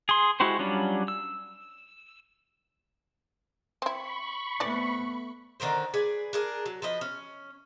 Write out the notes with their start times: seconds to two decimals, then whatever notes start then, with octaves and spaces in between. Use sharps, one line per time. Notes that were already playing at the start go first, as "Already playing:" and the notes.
0.09 G#4 C6
0.40 G#3 E4 F#4 G4 C5
0.59 F#3 G3 C#4 D4 F4
1.08 E6
3.82 C4 E4 B5 C#6
4.60 E3 A3 B3 C4 D5
5.60 D3 D#3 A#4 C5
5.94 G#4 B4 D5 G#5
6.33 D4 G#4 A#4
6.66 F#3
6.82 F3 B4 D#5
7.01 C#4